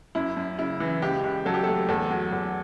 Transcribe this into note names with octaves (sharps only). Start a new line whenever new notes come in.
F#2 E4
F#2
C#3 E4
E3
C#2 G4
C#2
F#3 A4
G4
A3 A4
E2 A4
F#3
E2